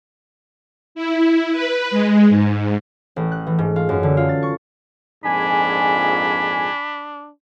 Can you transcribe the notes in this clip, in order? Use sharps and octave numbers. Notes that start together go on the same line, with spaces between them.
E4
B4
G#3
G#2
A1
F#6
E3
G#2
F4
F#2
D3
F4
A6
C#6
A#1 F2 G#2 D4 G#5 B5